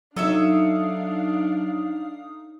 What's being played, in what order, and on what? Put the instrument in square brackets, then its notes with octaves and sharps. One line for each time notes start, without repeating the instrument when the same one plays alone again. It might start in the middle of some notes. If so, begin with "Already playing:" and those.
[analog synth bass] F#3 [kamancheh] D4 F5 [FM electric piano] D#4 D#6 [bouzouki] A4 C#5 E5